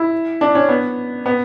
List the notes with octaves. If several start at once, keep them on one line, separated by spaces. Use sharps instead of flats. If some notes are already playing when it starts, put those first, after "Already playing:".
Already playing: E4
D4
C#4
B3
B3